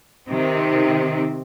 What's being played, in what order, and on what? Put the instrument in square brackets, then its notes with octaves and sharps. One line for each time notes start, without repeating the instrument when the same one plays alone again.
[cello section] C3 D#3 C4